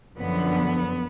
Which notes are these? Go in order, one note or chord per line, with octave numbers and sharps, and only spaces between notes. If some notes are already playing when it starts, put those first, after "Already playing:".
F#2 D3 F3 B3